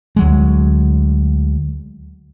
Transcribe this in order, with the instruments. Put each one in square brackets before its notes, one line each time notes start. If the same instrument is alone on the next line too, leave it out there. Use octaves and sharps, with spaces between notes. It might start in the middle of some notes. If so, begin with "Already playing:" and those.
[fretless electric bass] D2 F#3 G#3